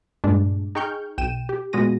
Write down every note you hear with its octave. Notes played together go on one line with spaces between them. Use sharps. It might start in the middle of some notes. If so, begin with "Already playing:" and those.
G2 A#2 G#3 D4
D#4 G#4 G5 C#6 F6 G6
B1 G5 D#7 E7
G4
A#2 G#3 B3 F#4 A#6 D#7